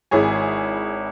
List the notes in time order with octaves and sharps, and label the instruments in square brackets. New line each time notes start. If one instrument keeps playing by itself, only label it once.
[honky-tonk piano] G#1 E4 G#4 C#5 G#5